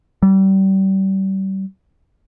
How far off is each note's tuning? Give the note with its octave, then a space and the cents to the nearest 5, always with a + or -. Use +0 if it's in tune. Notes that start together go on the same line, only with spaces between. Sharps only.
G3 -30